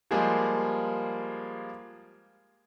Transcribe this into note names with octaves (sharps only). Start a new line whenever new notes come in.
F3 G3 G#3 A#3 G#4